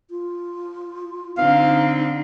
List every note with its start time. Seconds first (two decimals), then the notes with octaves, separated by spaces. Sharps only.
0.10 F4
1.38 D3 C4 D#4 F5